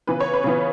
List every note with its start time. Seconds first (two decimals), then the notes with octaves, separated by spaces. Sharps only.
0.07 C#3 E3 B3 B4
0.20 C#5
0.34 B4
0.44 C#3 E3 B3